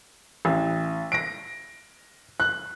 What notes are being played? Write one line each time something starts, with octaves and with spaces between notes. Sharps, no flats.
A1
A#6 D7
F#6